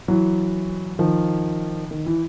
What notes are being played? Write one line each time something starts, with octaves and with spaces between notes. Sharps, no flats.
E3 F#3
D#3 F3
D#3
E3